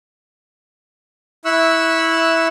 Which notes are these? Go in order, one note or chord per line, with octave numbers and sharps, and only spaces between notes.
E4 E5 C#6 E6 F#6